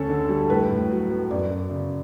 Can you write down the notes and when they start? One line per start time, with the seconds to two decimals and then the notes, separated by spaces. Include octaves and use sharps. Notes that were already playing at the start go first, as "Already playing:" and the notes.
Already playing: D2 C#4 A4
0.09 D3
0.29 G3
0.50 A2 B4
0.70 A2
0.90 F#3
1.10 B3
1.31 F#2 D5
1.51 F#2
1.70 C#3